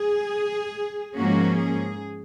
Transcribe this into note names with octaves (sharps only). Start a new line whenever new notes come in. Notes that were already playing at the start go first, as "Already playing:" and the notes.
Already playing: G#4
G#2 F3 A#3 C#4 F#4
G#4